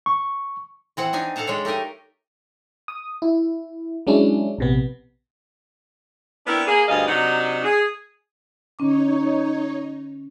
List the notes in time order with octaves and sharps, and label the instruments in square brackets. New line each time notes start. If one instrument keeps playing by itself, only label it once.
[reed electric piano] C#6
[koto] E3 C4 F#5
D4 D#4 G#5
A4 F5 F#5 A5 A#5
G#3 D4 C#5
A3 D#4 G4 A#4 D#5
[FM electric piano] D#6
E4
F#3 G#3 C#4 D4 E4
A#1 C3 B3
[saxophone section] B3 C4 D4 E4 A#4
A#3 G#4
D2 G2 G#4 D#5 F5
C3 F#3 D4 D#4 F#5
G#4
[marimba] D3 C#4 D6 [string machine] D#4 C#5